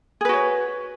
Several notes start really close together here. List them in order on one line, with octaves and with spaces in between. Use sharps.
G#4 B4 F#4 C#5